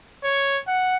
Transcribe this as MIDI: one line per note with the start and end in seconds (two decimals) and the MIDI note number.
0.24 0.58 73
0.67 0.96 78